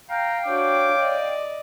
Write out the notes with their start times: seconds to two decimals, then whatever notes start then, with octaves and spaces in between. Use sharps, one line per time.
0.10 F5 G5 A#5
0.46 D4 F#4 C#5 D6
0.98 D5 D#5